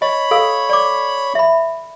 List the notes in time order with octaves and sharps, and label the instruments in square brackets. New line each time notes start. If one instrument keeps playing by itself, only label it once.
[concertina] C#5 B5 [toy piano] D#5
[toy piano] A4 F5 E6
D5 D6
E5 B5